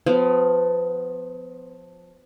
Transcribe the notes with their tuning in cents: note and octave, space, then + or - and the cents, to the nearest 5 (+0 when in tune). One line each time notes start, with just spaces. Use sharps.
F3 +15 B3 +35